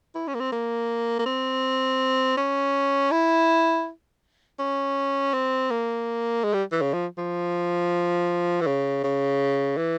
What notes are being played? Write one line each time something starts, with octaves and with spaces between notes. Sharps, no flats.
E4
C#4
A#3
C4
A#3
A#3
C4
C#4
E4
C#4
C4
A#3
G#3
G3
E3
C#3
F3
F3
E3
C#3
C#3
E3